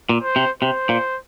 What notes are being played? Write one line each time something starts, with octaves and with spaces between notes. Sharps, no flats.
A#2
C5
C3
C3 C5
A#2